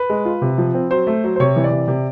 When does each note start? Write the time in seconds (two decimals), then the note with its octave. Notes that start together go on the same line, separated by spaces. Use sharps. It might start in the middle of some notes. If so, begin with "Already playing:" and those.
Already playing: B4
0.10 G#3
0.25 F4
0.42 C3
0.58 F3
0.74 C4
0.91 F#3 C5
1.07 A3
1.24 F#3
1.36 C5
1.40 C3 C#5
1.56 E3
1.64 D5
1.71 C3
1.88 C3